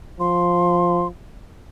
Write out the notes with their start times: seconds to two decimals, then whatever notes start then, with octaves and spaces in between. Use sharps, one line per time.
0.20 F3 C6